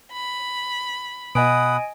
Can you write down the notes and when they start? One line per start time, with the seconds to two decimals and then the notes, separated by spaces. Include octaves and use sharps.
0.13 B5
1.35 B2 D#5 F#5 G#5 B5 D#6 D7